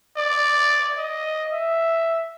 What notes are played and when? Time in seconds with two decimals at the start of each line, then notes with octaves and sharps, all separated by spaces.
0.17 D5
0.98 D#5
1.52 E5